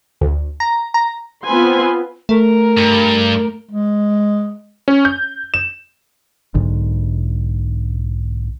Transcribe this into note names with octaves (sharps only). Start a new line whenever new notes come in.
D2
A#5
A#5
B3 C4 F4 B4 G#5 C6
A3 A#4
G2
G#3
C#4
G6
E7
B1 G#2 D3